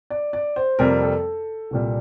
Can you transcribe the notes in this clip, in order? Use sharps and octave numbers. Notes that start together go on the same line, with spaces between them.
D5
D5
C5
F2 C3 G3 A#3 A#4
A4
C2 A#2 G3